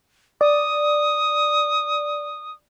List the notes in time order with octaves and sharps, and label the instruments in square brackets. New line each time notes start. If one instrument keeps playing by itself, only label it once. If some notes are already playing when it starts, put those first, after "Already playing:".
[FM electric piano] D5 [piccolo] D#6